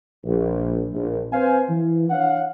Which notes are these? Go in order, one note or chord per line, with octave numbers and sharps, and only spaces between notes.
A#1
A#1
C4 B4 C5 F5 G#5
E3
D4 C#5 F5 F#5